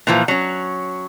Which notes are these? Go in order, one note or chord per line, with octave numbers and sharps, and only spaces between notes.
A#2 E3 F3
F#3 C#4